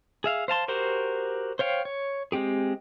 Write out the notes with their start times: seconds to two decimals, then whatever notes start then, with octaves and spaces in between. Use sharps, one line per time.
0.24 G#4 E5 F5
0.48 C5 F5 A5 C6
0.68 F#4 G4 A#4 C5 C6
1.59 C5 C#5 F5 G5
1.85 C#5
2.32 G#3 C4 G4 G#4